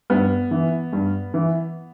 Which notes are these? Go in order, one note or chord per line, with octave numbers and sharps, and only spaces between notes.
G2 B3
E3
G2
E3